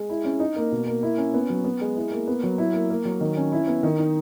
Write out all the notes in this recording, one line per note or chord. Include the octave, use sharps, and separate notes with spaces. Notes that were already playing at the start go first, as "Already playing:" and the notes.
Already playing: G#3
E4
C#4
D#4
A#3
B2
A#3
E4
C#4
B3
F#3
B3
G#3
E4
A#3
B3
F#3
E4
A#3
A#3
F#3
D#3
C#4
E4
B3
D#3
D#4